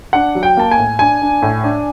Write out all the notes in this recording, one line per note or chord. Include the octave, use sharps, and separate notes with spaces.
D4 F#5
F#3
G5
A#3 A5
G#5
A2
D4 G#5
D4
A2
D4